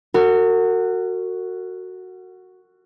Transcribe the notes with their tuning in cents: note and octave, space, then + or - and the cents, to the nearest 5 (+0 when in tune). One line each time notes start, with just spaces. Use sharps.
F#4 +0 A#4 -40